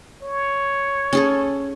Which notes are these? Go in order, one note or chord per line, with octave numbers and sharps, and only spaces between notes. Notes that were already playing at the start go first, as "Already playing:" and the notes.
C#5
C#4 G#4 A4